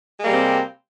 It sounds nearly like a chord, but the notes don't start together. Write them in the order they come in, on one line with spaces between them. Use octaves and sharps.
G#3 A#3 G3 C3 C4